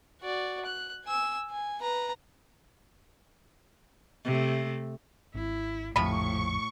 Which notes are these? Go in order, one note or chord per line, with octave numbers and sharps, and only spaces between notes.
F#4 D5
F#6
G#5 E6
G#5
B4 A#5
C3 A3
G#1 E4
A#1 F2 A2 C3 F3 B5 C#6